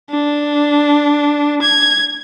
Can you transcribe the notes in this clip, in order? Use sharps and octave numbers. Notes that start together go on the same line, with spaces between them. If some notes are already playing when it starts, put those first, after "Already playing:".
D4
G#6